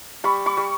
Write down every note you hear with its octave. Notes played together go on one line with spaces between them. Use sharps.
G3 B5 C#6
B5 C#6
G3